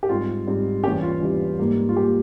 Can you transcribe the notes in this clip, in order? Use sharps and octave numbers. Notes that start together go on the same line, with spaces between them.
G4
G#2 G3 C4 F4
G#2 G3 C4
E2 E3 G3 C#4 G4
F4
E2 E3 G3 C#4
G#2 G3 A#3
F4
G3 A#3 G4